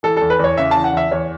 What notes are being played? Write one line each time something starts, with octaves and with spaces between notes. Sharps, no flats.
E3 A4
E2 A4
B4
E2 C#5
C#3 E5
E3 A5
F#5
E2 E5
E2 C#5